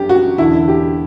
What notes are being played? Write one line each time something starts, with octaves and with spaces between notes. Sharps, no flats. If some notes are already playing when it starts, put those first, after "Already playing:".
Already playing: G1 F#2 D3 G4
F#4
E1 E2 D3 E4
G4